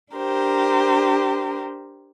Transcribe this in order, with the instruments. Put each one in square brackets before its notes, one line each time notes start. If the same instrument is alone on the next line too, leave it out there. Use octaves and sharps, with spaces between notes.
[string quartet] D4 G4 A#4 C5